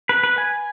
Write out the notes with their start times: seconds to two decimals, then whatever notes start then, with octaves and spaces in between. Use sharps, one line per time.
0.09 B4
0.23 B4
0.38 G#5